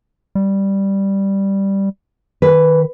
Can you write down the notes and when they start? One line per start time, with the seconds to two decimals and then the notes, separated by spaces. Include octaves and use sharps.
0.35 G3
2.42 D#3 B4